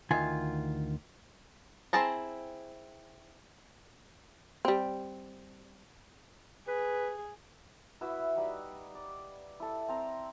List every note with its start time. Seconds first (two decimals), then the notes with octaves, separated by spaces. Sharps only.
0.11 D2 D#3 F4 G#5
1.93 C4 E4 G#4 A5 A#5
4.65 G3 C4
6.68 G#4 B4
8.01 E4 F#4 B4 E5
8.36 G3 D#4 B5 E6
8.95 D5
9.60 E4 A4
9.89 C4 A#5